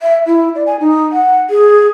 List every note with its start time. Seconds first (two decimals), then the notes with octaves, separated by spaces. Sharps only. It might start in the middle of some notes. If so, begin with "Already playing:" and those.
0.02 E5
0.26 E4
0.55 D5
0.67 G#5
0.80 D#4
1.12 F#5
1.50 G#4